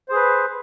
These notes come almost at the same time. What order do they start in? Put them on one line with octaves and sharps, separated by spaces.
C5 G#4 B4